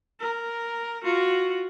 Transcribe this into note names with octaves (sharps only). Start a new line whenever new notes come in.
A#4
F4 F#4